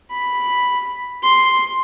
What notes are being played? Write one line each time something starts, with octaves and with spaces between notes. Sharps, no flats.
B5
C6